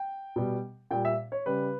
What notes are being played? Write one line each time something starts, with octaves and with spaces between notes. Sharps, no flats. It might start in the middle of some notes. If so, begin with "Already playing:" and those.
Already playing: G5
B2 G3
A#2 G3 G5
E5
C#5
C#3 G3 B4